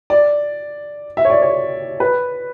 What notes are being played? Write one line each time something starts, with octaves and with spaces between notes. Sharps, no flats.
D5
E5
C#5
D5
C#5
B4